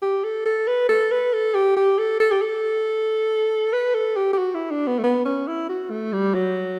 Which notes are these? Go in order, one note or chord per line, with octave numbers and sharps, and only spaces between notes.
G4
A4
A4
B4
A4
B4
A4
G4
G4
A4
A4
G4
A4
B4
A4
G4
G4
F#4
E4
D4
B3
A3
B3
C#4
E4
F#4
A3
G3
F#3